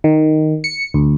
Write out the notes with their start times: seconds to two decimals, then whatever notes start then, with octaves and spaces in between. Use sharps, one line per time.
0.04 D#3
0.64 C#7
0.94 D2